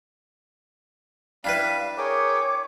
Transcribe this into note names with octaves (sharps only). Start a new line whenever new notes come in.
G3 D4 E4 B4 F5
G#4 A#4 C#5 G5 D6